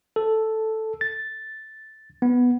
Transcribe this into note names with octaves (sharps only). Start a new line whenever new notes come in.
A4
A6
B3